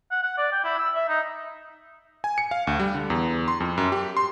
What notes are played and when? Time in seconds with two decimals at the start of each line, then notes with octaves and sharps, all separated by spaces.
0.11 F#5
0.23 F#5
0.38 D5
0.52 G5
0.65 E4
0.79 E6
0.95 E5
1.09 D#4
2.24 G#5
2.38 C#7
2.51 F5
2.67 D2
2.80 G3
2.95 D3
3.10 E2
3.48 C6
3.60 F2
3.78 F#2
3.92 G4
4.17 C6